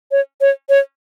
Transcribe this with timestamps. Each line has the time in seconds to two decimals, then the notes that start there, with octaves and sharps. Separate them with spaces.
0.11 C#5
0.41 C#5
0.69 C#5